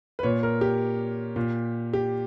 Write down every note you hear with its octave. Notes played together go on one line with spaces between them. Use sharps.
B4
A#2 C#5
A#4
G4
A#2
G4